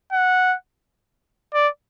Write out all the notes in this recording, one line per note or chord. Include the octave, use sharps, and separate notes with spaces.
F#5
D5